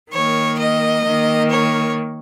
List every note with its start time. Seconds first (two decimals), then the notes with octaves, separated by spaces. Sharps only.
0.12 D#3 A#3 C#5
0.59 D#5
1.05 D#3 A#3
1.51 C#5